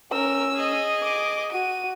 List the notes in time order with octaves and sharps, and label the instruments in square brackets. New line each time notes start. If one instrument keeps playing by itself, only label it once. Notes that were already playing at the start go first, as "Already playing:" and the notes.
[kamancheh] C#4 E6 [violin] A#4
[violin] G#4 D#5
[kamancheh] D6
[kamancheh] F#4 [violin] D#7